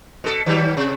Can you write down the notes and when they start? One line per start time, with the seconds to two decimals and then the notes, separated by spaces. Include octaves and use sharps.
0.24 B2 A4
0.46 D#3 F#3 G3
0.77 C3